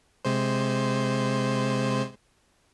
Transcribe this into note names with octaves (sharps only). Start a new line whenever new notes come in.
C3 G#3 C5